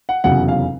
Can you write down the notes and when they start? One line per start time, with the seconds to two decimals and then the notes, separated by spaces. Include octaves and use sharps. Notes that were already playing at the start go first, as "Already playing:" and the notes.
0.09 F#5
0.24 F1 E2 C#3 F#3 F#5
0.48 F5